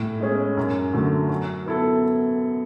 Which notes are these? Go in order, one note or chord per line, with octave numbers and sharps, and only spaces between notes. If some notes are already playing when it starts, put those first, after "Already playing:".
Already playing: A2
G#3 C#4 G#4
F#2
D3 F#3 A3
F#3
B3 E4 A4